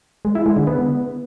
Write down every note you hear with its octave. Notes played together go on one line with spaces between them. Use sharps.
G#3
E4
G#3
D3
B3